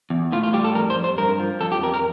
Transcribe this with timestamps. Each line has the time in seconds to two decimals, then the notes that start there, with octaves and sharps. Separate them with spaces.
0.10 E2
0.32 A2 F4
0.43 F4
0.53 G3 G4
0.64 A4
0.75 F2 A#4
0.90 C5
0.97 F2
1.04 C5
1.18 G2 A#4
1.40 F3
1.61 F2 A4
1.72 G4
1.83 F2 A#4
1.94 A#4